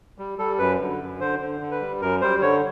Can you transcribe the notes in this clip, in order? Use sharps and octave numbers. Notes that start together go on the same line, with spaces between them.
G3
G3 A4
F#2 B4
D3
F#2
D3 C5
D3
D3
B4
G3
F#2 A#4
G3 C5
D3 C#5